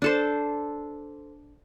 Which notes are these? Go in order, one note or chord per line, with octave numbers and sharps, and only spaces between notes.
D4 A4 C5